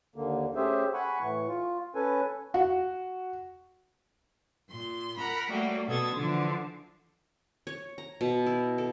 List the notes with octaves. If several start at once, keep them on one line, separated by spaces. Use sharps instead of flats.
D#2 D3 A#3
A3 C#4 G4 G#4 C5 E5
F#5 G#5 B5 C#6
A2 E3 C#6
F4
C#4 A4 B4 G#5
F#4
A#2 C6
A#4 F#5 A#5 B5
F#3 G3 A3 A#3
B2 F#4 A4 D#6 G#6 A6
D3 E3 F3
C#5
A#5
B2
E4
A4